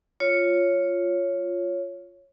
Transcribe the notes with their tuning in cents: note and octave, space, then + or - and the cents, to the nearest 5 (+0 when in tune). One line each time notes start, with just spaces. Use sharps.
F4 +0 C#5 +0